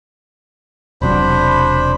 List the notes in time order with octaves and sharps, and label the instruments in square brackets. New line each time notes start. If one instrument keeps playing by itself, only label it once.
[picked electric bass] E1 C3 F#3 [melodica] D4 C5 B5